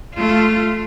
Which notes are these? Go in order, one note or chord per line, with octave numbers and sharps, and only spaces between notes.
A3 F4